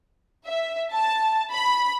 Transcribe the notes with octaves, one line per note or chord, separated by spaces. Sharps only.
E5
A5
B5